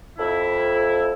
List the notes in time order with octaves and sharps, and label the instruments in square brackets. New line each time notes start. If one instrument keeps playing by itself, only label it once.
[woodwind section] F2 E4